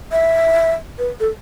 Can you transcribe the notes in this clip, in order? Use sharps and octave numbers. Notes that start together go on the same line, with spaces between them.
E5
B4
A4